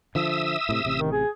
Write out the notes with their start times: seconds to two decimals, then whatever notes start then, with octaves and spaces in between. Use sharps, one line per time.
0.15 D3 F3 E5 D#6 E6
0.69 A2 C3
0.85 A1 C3
0.99 D#3
1.12 G#4